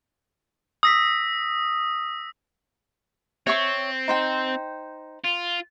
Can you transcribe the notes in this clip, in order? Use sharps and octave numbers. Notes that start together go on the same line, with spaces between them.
D#6 E6 A#6 B6
C4 C#5 E5 C#6
D#4 C5 G5
F4